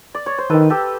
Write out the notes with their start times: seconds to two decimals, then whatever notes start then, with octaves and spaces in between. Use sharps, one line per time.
0.15 D5
0.26 C#5
0.38 C5
0.50 D#3 A4 B4
0.70 G4 A4